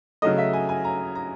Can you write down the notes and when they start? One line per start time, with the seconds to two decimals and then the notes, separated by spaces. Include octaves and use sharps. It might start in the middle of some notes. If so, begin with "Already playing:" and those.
0.22 C#3 F#3 A3 D#5
0.38 E5
0.53 G#5
0.69 G#5
0.84 A#5
1.15 A#5